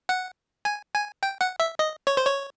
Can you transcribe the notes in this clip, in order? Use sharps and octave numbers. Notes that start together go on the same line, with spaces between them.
F#5
G#5
G#5
G5
F#5
E5
D#5
C#5
C5
C#5